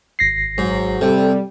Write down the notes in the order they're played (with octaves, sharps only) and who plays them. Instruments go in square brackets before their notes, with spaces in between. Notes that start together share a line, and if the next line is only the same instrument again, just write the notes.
[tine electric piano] G#1 A#6 C7
[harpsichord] G#2 [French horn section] F#3
[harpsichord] C3 [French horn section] G3 [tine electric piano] A4